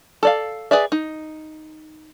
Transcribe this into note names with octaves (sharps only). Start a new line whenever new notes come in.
A4 D5 F5
G#4 B4 D5 E5
D#4